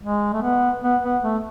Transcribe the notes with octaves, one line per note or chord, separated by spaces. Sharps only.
G#3
A3
B3
B3
B3
A3